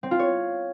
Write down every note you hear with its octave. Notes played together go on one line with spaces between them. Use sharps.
C4
F4
C#5